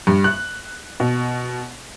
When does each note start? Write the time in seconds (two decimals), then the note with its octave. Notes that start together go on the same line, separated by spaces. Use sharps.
0.07 G2
0.24 F#6
1.00 B2